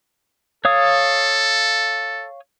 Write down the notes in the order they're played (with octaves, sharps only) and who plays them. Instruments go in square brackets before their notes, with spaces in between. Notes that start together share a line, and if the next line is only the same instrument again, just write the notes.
[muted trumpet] A4 [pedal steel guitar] C#5 F5 D#6